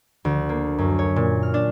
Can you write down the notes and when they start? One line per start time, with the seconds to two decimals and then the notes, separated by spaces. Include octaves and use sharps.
0.25 D2
0.49 A#3
0.78 F#2
0.99 C#5
1.16 A#2
1.43 F6
1.54 D4